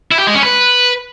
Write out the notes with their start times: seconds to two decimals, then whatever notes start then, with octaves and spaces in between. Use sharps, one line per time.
0.11 E4
0.19 G4
0.27 G#3
0.35 C#4
0.43 B4